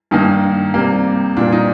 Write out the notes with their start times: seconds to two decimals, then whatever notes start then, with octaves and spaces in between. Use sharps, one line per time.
0.11 G2 D#3 A#3 D#4
0.74 C3 G3 A#3
1.37 A#2 G3 A#3 D4
1.52 D#4